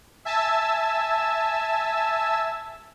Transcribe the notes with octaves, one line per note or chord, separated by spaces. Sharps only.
E5 G#5 A5 E6